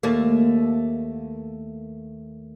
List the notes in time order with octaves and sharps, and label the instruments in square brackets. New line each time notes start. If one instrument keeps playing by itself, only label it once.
[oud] D#2 A3 A#3